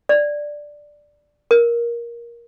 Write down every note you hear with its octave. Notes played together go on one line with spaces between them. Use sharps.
D5
A#4